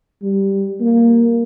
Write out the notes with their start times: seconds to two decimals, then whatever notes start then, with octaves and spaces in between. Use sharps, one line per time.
0.22 G3
0.80 A#3